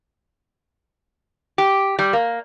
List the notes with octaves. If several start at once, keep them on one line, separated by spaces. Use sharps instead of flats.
G4
G3
A#3